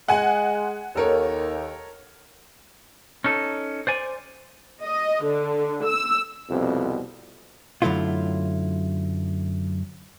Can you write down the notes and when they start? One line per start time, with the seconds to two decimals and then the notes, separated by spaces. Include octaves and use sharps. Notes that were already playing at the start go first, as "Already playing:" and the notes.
0.08 G#3 F#5 G#5
0.96 D#2 A4 A#4 C#5
3.24 C#4 D#4 A4
3.87 C5 D5 G#5
4.83 D#5
5.25 D3
5.86 E6
6.50 C2 F2 B2
7.82 F#2 D3 F#3 A3 E4 F4